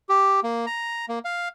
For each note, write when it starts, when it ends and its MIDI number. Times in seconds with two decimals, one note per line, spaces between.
0.09 0.40 67
0.43 0.66 58
0.66 1.06 82
1.09 1.19 58
1.25 1.49 77